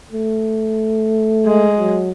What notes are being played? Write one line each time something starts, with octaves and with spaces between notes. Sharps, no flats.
A3
G#3
F#3